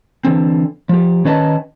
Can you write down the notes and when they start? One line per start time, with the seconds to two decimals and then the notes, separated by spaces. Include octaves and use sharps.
0.25 D3 E3 C4
0.89 F3 G4
1.25 D#3 C#4 D#4 B4 D#5 A5